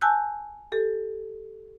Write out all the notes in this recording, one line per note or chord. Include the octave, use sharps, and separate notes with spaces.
G#5 A5 E6 F#6 G6
G4 A4